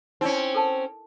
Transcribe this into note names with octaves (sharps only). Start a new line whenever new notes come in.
C4 C#4 D#4 E4 D5
A4 A#4 A5